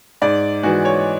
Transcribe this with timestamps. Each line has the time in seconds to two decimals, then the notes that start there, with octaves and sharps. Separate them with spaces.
0.22 G#2 D5
0.63 E3 G#3 F#4
0.85 C#5